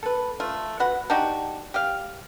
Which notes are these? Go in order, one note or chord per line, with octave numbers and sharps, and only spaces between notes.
A4 B4
A3 F4
F#4 B4 F#5
D4 D#4 F#4 G4
G4 F5